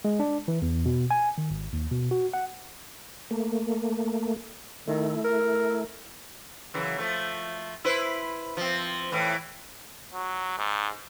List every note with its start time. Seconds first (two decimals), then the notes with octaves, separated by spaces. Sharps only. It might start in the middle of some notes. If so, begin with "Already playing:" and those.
0.05 G#3
0.20 D4
0.48 E3
0.62 E2
0.86 B2
1.11 G#5
1.38 D#3
1.51 G#1
1.73 D#2
1.91 B2
2.11 F#4
2.33 F#5
3.31 A3 A#3
4.87 D#3 A3 E4
5.24 A#4
6.74 F#2 C#3 E3
6.98 F3 A3
7.84 E4 B4 C5
8.57 F3 C4
9.12 A2 E3
10.14 F#3
10.58 G#2